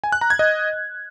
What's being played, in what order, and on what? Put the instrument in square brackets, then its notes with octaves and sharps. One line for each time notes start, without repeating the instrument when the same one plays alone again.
[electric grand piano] G#5
F#6
A#5
G#6
D#5